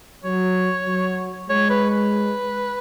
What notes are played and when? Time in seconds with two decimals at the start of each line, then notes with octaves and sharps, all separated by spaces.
0.24 F#3 C#5
0.87 F#3
1.49 G#3 C#5
1.70 B4
1.90 B4